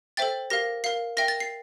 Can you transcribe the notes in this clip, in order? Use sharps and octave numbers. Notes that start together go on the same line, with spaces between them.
A4 C5 E5 G5 A6
G4 A#4 F5 A#6
A#4 F5 C7
A#4 E5 G5 A#6
A6
C7